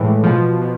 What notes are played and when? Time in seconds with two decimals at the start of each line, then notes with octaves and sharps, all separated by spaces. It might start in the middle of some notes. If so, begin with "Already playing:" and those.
Already playing: A2 E3 G#3
0.24 B2 F3
0.62 B2